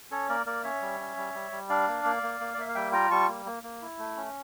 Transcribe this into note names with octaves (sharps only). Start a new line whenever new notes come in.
C#4 A4 C#5
A#3 A#4 D5
A#3 A#4 D5
C#4 C#5 E5
G3
C#4
G3
G3
G3
D4 D5 F5
A#3
A#3
A#3
A#3
D5
A#3 E5
F5
G3 E5 G5
F4 G5 A#5
G3 A5 C#6
A#3
A#3
A#3
E4
A3
C#4